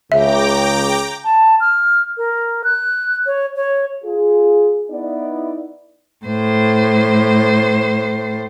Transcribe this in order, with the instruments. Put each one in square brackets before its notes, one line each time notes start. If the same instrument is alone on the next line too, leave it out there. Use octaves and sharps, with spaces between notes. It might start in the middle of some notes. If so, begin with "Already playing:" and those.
[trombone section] C#2 C#3 [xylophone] E5 [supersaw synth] G5 A#5 D6
[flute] A5
F6
A#4
F#6
C#5
C#5
[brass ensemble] F4 G#4
B3 D#4 E4 D5
[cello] A2 C5